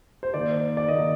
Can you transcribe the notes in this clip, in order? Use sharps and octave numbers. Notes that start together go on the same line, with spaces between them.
C5
D#3 A#3 D5
D5
D#3 A#3 D#5